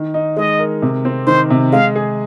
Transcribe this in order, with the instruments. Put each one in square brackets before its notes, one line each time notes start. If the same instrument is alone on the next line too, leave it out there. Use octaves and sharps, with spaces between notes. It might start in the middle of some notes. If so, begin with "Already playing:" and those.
Already playing: [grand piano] D#3
D#4
[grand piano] G#3 [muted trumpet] D#5
[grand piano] A#4
C3
C4
[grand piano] D#3 [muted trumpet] C5
[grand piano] C3
[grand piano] G#3 [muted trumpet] F5
[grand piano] G#4